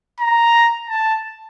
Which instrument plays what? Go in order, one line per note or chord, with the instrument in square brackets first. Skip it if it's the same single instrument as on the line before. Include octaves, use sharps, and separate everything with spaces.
[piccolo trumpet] A#5
A5